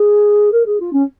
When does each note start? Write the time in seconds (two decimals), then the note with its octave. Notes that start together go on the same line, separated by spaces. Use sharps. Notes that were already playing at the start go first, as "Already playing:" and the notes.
Already playing: G#4
0.52 A#4
0.65 G#4
0.80 F4
0.93 C#4